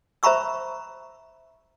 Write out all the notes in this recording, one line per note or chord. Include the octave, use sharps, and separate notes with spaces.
C5 E5 A#5 B5 C#6 E6